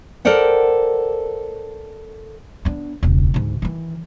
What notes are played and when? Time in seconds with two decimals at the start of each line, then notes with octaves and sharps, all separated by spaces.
0.25 A4 A#4 C5 D5 F#5 G5
2.65 B3 D4
3.03 E1 C#2
3.34 D2 G#2
3.62 D#3 E3